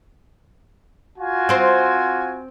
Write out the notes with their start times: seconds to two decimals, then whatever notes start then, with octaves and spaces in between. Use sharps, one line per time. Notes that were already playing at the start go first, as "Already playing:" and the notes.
1.18 F4 F#4 G#5
1.49 C4 C5